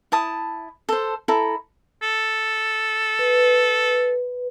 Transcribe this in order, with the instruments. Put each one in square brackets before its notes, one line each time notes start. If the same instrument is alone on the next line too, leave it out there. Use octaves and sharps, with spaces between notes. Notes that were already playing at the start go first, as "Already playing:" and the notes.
[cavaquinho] E4 A5 D#6
A4 C5
E4 A4 A#5
[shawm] A4
[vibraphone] B4